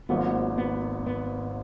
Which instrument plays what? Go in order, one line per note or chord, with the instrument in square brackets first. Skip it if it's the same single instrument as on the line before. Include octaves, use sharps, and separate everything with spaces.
[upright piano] G#1 G#2 F#3 A#3 F4 [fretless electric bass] B3
[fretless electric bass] B3
B3